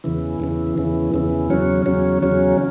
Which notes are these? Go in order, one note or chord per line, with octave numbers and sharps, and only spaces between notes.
E2 C#3 E3
E2 C#3 E3
E2 C#3 E3
E2 C#3 E3
E2 C#3 F#3 C#4
E2 C#3 F#3 C#4
E2 C#3 F#3 C#4